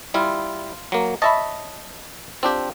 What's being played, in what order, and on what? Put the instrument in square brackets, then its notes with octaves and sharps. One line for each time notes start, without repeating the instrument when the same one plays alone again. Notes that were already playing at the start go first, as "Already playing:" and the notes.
[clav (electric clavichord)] G3 E4 [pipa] F4
[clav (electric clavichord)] F#3 A#3
[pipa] C#5 E5 B5 [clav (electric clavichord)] D#5 A5
[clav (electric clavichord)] C4 D4 G4 [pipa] F4